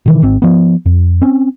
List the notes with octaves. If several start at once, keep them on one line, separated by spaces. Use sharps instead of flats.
B2 D#3 E3
G#1 C4
F3 B3
F2
C4 C#4